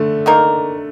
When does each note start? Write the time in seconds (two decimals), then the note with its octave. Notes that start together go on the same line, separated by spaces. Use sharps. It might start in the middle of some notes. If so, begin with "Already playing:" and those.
Already playing: D3 A3
0.26 D#3 A#3 D#4 A#4